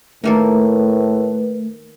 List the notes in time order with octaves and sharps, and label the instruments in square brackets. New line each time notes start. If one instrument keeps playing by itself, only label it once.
[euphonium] A2 [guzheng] D#3 A#3 A4 [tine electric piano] A3 [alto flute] B4